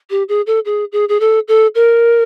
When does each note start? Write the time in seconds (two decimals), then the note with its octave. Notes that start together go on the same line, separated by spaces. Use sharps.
0.10 G4
0.29 G#4
0.47 A4
0.65 G#4
0.92 G#4
1.09 G#4
1.20 A4
1.48 A4
1.75 A#4